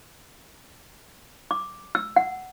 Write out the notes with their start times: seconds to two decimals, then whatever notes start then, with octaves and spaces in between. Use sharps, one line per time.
1.51 D6
1.95 E6
2.16 F#5